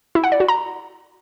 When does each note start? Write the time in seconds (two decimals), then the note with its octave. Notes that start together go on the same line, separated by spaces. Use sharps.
0.15 E4
0.24 F#5
0.32 D5
0.40 F#4
0.48 A#5